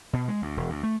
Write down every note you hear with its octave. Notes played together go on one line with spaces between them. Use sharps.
B2
G#3
D2
E1
D2
A3